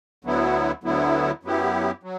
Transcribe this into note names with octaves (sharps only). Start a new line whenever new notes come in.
D2 D3 F#3 B3 E4
D2 D3 F#3 B3 E4
F#2 F#3 B3 E4 G4
F#3